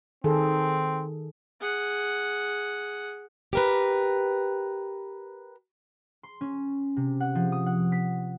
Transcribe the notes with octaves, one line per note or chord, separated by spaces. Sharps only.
D#3 C4 G#4 A4
G#4 F#5
G4 A#4 B4
C6
C#4
C3
F#5
F3
D#6
F#5
B6